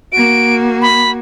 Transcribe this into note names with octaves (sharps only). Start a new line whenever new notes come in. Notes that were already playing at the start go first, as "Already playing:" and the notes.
A#3 F#4 D7
B5